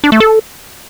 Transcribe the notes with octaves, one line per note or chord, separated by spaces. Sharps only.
D4
A3
A4